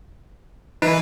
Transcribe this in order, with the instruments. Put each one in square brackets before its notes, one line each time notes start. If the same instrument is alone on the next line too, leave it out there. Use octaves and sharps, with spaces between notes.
[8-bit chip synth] E3 B4 [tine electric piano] D#4